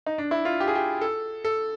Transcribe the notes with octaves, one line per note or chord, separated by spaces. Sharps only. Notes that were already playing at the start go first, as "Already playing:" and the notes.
D#4
D4
E4
F4
G4
G#4
G4
A4
A4